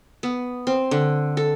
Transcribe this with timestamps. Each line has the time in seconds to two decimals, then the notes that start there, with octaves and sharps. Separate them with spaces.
0.23 B3
0.67 C4
0.91 D3
1.37 A4